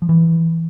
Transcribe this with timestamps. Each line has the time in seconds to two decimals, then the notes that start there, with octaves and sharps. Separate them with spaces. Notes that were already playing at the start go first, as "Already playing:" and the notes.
0.02 F3
0.09 E3